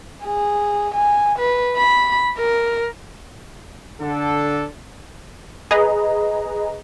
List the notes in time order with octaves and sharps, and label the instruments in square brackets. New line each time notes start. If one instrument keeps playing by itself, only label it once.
[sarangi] G#4
G#5
B4
B5
A#4
[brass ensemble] D3 A4
[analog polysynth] G#4 B4 D#5 A#5